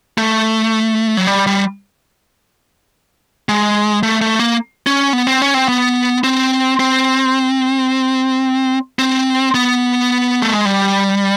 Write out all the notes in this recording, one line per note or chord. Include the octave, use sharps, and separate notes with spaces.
A3
F#3
G3
G3
G#3
A3
A3
A#3
C#4
B3
C4
C#4
C4
B3
C4
C4
C4
B3
A3
G#3
G3